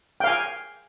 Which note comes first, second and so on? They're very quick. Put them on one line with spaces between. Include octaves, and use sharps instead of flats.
G5 F5 G#5